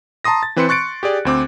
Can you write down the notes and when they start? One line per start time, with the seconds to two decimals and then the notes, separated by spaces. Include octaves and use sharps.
0.24 A5 A#5 C6 D#6 A#6
0.43 A6
0.56 E3 C4 B4 C5 C6 C#7
0.68 C6 C#6 F#6 A6 C#7 D7
1.03 G4 G#4 D5
1.25 D2 C4 D6